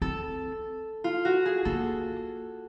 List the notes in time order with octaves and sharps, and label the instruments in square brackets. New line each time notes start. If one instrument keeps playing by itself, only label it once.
[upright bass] C4 [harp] A4
[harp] F4
F#4
G#4
[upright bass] A#3 [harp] A4